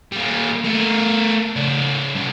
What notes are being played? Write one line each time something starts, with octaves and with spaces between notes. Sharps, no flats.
G3 A#3
A3 A#4
C#3 D5
G2 C3